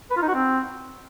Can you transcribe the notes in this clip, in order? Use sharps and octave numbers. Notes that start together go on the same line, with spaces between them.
B4
F4
D#4
F#4
C4